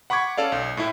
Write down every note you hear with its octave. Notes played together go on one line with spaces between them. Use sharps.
F#5 B5 C#6 D6 G#6
C#4 A4 D5 F5
B1
A2 E4